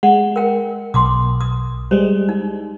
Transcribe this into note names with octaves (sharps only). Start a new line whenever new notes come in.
G#3 F#5
A#4 G5
B1 C6 D6 D#6
D#6
G3 G#3 C5
D#4